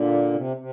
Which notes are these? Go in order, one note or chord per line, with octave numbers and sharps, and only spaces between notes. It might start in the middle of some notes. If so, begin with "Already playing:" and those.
Already playing: A#2 D3
C3
C3